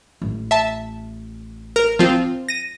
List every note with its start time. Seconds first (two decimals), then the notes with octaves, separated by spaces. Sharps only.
0.22 A1
0.51 E5 A5
1.76 A#4
1.99 F3 C4 F4
2.49 A#6 D#7